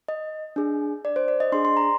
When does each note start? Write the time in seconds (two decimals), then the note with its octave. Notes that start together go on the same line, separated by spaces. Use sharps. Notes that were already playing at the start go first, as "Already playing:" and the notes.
0.08 D#5
0.56 D4 G#4
1.05 D5
1.16 C5
1.28 D5
1.40 D#5
1.52 D4 G#4 C6
1.65 C6
1.77 A#5